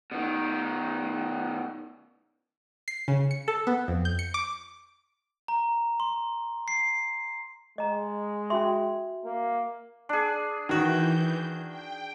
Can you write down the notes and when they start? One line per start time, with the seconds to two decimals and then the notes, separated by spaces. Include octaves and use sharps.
0.12 B2 D#3
2.88 C7
3.08 C#3
3.31 C#7
3.48 A4
3.67 B3
3.88 F2
4.05 G6
4.19 C#7
4.34 D6
5.48 A#5
6.00 C6
6.68 C7
7.78 G#3 D#5 A#5
8.50 C#4 F#4 E5 C6
9.25 A#3
10.09 D4 G#4
10.69 D#3 E3 F#4 G6
11.69 G5